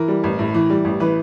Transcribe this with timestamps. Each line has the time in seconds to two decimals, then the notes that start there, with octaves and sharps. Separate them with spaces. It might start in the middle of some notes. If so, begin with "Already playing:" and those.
Already playing: E3 A#4
0.08 G3
0.24 A1
0.39 A2
0.54 E3
0.70 G3
0.85 A1
1.00 E3 B4